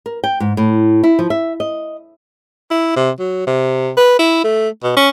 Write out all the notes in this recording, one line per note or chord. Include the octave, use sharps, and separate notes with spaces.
A#4
G5
G#2
A2
E4
F3
E5
D#5
E4
C3
F#3
C3
B4
E4
A3
B2
C#4